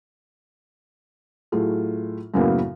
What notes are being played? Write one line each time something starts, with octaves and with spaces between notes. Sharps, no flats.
A2 F#3 A3 F4 G#4
F#2 A2 C#3 F#3 A#3 B3